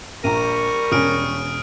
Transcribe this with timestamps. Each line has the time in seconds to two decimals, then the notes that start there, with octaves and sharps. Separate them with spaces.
0.24 A#1 G3 A#4 A#5 C#6 D#7
0.92 E1 C#4 D#6 F6 D7